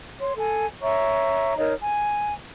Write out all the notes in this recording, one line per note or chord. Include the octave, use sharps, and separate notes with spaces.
C#5 C6
A4 G#5
C#5 E5 A#5 C#6
D#4 A#4 C#5 D#5
G#5